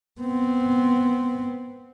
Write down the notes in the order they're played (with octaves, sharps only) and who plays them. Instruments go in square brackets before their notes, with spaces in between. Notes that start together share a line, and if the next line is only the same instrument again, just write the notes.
[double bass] B3 C4